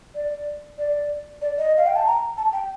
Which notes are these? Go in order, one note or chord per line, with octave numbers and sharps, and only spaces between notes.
D5
D5
D5
D#5
F5
G5
A5
A#5
A5
G5